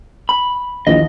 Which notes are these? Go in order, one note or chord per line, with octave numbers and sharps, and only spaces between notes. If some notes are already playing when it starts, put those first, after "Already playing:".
B5
A#1 D#2 E3 D#5